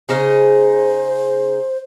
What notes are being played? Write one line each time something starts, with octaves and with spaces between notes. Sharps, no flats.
C#3 D#4 G#4 C5